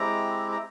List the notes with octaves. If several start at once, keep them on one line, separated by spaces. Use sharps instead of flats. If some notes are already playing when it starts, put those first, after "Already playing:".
Already playing: G#3 C4 E4 G4 A#5
A#5